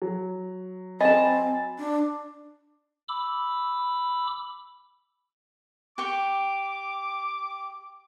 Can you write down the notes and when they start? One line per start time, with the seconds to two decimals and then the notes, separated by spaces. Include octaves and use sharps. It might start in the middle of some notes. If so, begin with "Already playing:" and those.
0.02 F#3
1.00 C4 D#5 G#5 A5 B5 A6
1.78 D4
3.08 B5 D6 E6
5.98 G4 G5 C#6 D6